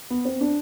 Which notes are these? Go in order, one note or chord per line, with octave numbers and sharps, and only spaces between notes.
B3
C4
D4